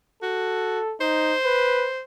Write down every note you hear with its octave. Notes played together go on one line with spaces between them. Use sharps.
F#4 A4
D#4 C5
B4